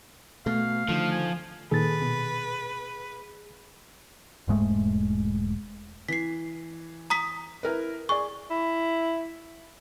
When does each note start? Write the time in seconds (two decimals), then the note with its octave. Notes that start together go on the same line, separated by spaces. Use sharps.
0.46 B2 A3 F5
0.89 D3 D#3 F3
1.12 G#5
1.71 A#2 D#3 G#4 A4 B4 A6
2.02 B2
4.48 E1 G#2 G#3 A3
6.08 E3 B6 C7
7.10 A#5 D#6 B6
7.63 E4 A#4 B4
8.09 G#4 D5 C#6
8.50 E4